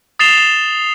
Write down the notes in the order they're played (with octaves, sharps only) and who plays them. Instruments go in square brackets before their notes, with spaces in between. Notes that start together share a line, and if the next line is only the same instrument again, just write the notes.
[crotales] D#6 A6 C7 E7 F7 G7